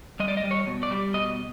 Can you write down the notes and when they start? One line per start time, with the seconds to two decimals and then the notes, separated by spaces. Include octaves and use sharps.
0.20 G3 D#5
0.28 D5
0.37 D#5
0.43 G3
0.51 C#5
0.67 B2
0.83 D5
0.91 G3
1.14 B2 D#5